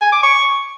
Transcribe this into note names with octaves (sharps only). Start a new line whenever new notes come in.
G#5
D6
C#6